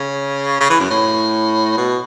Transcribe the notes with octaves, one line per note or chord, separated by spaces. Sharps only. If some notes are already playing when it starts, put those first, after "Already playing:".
Already playing: C#3
C#3
E3
F#2
A2
B2